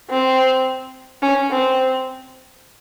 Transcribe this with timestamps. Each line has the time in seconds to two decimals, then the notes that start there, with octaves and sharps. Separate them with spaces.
0.10 C4
1.22 C#4
1.51 C4